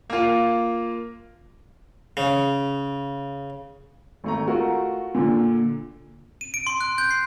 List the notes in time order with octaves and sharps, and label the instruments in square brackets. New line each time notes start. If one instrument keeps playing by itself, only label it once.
[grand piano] A#3 F4
[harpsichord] C#3
[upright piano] G#1 A3 A#5
A3 F4 F#4 A#4
A#2 D3
[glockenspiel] D#7
D7
C6
F#6
G6
C7